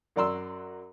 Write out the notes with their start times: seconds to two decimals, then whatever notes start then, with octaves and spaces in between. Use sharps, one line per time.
0.16 F#2 F#3 D5 A#5 C6 E6